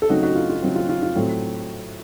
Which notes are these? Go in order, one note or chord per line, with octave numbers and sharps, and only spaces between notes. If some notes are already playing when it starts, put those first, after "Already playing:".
A4
C#3 F#3 A3 C4 D#4 F#4
D#4 F#4
F4
F4
C#3 F#3 A3 C4
F4
F4
F4
A2 F#3 A3 C4